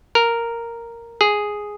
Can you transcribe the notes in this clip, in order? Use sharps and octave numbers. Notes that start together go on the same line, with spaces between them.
A#4
G#4